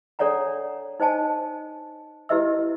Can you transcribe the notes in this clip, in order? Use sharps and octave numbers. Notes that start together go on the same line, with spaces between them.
D4 A4 C#5 D5 F#5 A#5
D#4 C5 D#5 G#5 A5
E4 G4 B4 D#5 E5 E6